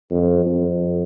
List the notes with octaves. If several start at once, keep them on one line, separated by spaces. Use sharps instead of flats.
F2
F2